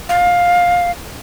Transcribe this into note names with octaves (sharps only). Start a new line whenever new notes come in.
F5